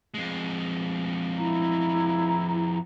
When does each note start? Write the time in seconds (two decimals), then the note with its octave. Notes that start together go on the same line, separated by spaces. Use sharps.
0.14 F2 G#3
1.37 E4 A#5